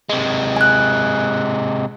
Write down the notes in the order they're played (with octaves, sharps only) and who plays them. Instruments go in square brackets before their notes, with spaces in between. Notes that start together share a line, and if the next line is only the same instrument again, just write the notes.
[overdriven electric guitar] C3 G#3
[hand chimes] G#5 F#6